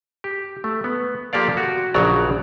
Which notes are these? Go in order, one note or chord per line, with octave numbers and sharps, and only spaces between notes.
G4
A3
B3
F3 A#3 G4 A4 D5 F5
F#4
A#1 C#3 F#3 F#4 D5 A#5